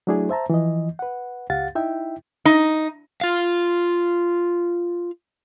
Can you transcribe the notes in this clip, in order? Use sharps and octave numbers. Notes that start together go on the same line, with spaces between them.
F#3 A3 D4 E4 G#4
C5 E5 A5 A#5
E3 F3 D#5
B4 F#5
C#2 G4 F5 F#5 A6
D#4 E4 E5 G5
D#4
F4 F5